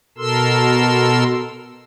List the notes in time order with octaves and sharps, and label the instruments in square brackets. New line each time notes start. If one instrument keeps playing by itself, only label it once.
[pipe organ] B2 A4 A#4 C6 E6